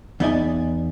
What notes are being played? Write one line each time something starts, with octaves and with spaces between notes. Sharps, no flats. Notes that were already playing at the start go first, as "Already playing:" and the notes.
E2 B3 D#4 D5 E5 G#5